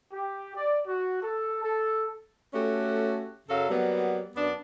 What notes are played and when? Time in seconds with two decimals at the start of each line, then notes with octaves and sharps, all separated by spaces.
0.11 G4
0.55 D5
0.87 F#4
1.22 A4
1.63 A4
2.54 A3 C#4 F#4 G4 A4
3.49 F#2 C#3 F#3 A4 F5
3.69 F#3 G3 A#3 B3
4.36 F#2 B3 D4